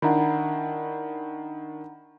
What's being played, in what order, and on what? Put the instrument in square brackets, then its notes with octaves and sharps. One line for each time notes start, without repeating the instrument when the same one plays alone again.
[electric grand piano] D#3 D4 E4 [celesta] F#5 A#5 B5